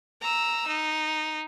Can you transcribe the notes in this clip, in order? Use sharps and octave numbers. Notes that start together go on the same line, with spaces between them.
A#5 E6
D#4